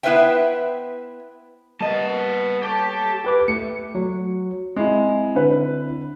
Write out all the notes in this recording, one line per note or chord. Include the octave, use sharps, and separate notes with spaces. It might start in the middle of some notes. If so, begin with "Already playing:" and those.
B3 E4 B4 C5 E5 G5
G3 A#3 B3 D#5 A5
G4 A4 C#5 A5
G4 B4 D6
A3 C#7
F#3
G#3 C4 E4
D3 B4